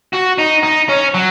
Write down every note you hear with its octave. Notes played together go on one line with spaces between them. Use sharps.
F#4
D#4
D#4
C#4
F#3